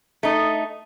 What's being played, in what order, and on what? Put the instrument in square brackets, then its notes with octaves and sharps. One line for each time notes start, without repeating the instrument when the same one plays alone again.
[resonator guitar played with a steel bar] A3 D#4